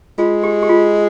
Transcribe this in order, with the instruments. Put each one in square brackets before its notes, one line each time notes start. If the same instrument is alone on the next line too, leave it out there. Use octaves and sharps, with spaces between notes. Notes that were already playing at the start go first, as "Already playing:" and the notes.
[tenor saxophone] G#3 [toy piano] F4
[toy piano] G4
G4
F4